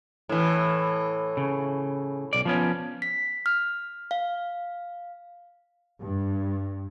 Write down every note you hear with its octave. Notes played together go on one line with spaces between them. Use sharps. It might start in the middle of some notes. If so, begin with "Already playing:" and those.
A2 E3
C#3
B1 D5
F3 B3 C#4
B6
F6
F5
G2